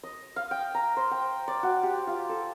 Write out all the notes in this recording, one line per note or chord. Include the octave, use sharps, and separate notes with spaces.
D#5
F5
G5
A#5
C5
G5
D5
F#4
G4
F4
A4